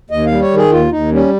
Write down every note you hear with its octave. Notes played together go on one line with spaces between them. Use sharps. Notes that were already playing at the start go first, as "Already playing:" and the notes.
D#2 D#5
F5
G3
C#5
D#3
G#4
D#2 F4
D#2 D#4
G3 C#4